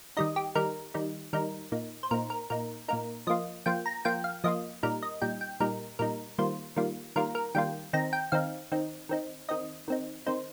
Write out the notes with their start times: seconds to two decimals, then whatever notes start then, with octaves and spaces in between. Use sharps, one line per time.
0.17 D#3 G3 D#4 D#5
0.36 G4
0.55 D#3 G3 D#4 A#4
0.94 D#3 G3 D#4
1.33 D#3 G3 D#4 A#4
1.72 A#2 A#3 D#4
2.03 C5
2.11 A#2 A#3 D#4 A#4
2.30 A#4
2.50 A#2 A#3 D#4 A#4
2.88 A#2 A#3 D#4 A#4
3.27 F3 A#3 F4 D#5
3.66 F3 A#3 F4 G5
3.86 A#5
4.05 F3 A#3 F4 G5
4.24 F5
4.44 F3 A#3 F4 D#5
4.83 A#2 G3 D#4 A#4
5.03 D#5
5.22 A#2 G3 D#4 G5
5.41 G5
5.60 A#2 G3 D#4 A#4
5.99 A#2 G3 D#4 A#4
6.38 D#3 G3 A#3 F4 C5
6.76 D#3 G3 A#3 F4
7.16 D#3 G3 A#3 F4 A#4
7.35 A#4
7.55 D#3 G3 A#3 F4 G5
7.93 D#3 C4 D#4 A#5
8.13 G5
8.32 D#3 C4 D#4 F5
8.72 D#3 C4 D#4
9.09 D#3 C4 D#4
9.49 D#3 C4 D#4 D#5
9.88 D#3 C4 D#4
10.26 D#3 C4 D#4 C5